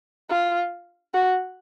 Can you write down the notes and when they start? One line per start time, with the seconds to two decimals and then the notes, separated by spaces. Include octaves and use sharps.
0.30 F4
1.14 F#4